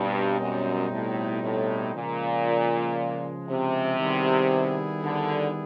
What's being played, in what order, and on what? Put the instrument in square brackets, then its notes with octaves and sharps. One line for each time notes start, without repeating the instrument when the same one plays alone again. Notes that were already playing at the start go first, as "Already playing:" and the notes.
Already playing: [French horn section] G2 [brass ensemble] B2 G3 C4 D#4
[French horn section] F#2
A2
A2
[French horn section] A#2 [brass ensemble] C#3 F3 G#3
[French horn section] C3
[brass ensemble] D#3 G3 B3 E4 G#4
[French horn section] D3